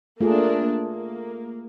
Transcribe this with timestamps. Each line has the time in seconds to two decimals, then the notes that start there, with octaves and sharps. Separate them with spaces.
0.21 A3 A#3 D4 F4 G#4
0.83 A#3